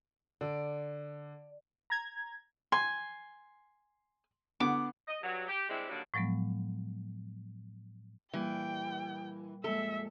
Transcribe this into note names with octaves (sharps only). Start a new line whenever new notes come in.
D3 D5
A#5 G#6
G#5 C6
D3 B3 D6
D#5
G2 F#3
G4
C3 G3 G#3 D4 E4 G4
D3 D#3 F#3 G3 A#3 D4
A2 F3 F#3 G#3 B3
A#2 E3 G3 G5
F2 A#2 G#3 A4 E5